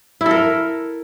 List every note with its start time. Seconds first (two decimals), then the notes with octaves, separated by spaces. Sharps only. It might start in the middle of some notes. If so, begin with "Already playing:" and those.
0.21 E4
0.26 A4
0.31 A#4